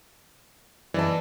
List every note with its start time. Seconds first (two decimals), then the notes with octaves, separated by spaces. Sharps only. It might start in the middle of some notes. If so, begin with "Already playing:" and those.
0.94 E3 D5 D#5 A5